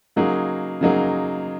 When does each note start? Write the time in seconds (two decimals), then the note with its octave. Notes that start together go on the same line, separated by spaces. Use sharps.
0.16 C#3 F#3 A#3 D#4 G#4
0.81 C#3 F#3 A#3 D#4 G#4